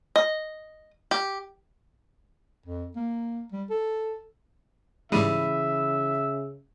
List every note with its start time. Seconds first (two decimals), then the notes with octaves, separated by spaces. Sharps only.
0.16 D#5
1.11 G4
2.66 F2
2.96 A#3
3.52 G3
3.70 A4
5.12 G#2 C#3 E3 G3 G#3 E5 B5 D#7